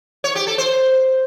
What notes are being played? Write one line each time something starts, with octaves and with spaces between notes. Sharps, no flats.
C#5
G4
A4
C5